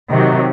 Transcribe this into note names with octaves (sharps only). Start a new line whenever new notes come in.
C3 D#3 F#3